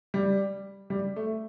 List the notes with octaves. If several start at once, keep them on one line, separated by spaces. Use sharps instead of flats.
G3
G3
A3